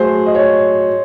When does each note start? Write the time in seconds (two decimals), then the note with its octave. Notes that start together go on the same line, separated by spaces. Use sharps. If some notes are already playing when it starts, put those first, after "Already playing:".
Already playing: F#3 A3 G#4 C5
0.26 D#5
0.35 C#5